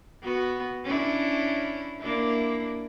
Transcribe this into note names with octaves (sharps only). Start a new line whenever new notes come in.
B3 F#4
C#4 D4 E4
A#3 D4 E4